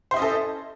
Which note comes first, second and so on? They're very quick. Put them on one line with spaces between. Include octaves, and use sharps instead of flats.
C5 E4 D#5 C#4 A4